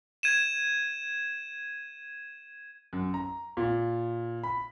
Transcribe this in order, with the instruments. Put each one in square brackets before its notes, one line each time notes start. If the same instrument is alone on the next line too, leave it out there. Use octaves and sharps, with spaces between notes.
[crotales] G#6 D#7 E7
[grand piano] F#2
A#5
A#2
B5